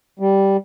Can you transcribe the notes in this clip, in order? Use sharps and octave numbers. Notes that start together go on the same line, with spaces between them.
G3